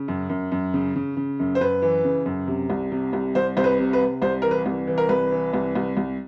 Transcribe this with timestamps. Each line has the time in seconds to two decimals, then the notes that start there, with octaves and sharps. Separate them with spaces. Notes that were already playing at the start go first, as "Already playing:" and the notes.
Already playing: C#3
0.08 F#2
0.30 F#2
0.52 F#2
0.74 C#3
0.96 C#3
1.17 C#3
1.40 F#2
1.55 C5
1.60 F#2 B4
1.82 E3
2.04 C#3
2.26 F#2
2.47 C3
2.70 C2
2.92 C3
3.13 C2
3.35 C2 C5
3.57 C2 C5
3.64 B4
3.79 C3
3.93 B4
4.00 C3
4.22 C2 C5
4.42 E3 A#4
4.51 B4
4.66 C2
4.87 E3
4.98 A#4
5.09 C2 B4
5.32 E3
5.53 C2
5.75 C2
5.97 C2